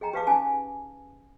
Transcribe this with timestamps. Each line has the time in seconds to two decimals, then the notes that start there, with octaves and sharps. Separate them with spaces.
0.01 G#4 D#5 G5 A#5
0.13 G4 B4 F5 A5 D6
0.27 C#4 D#4 G#5 A5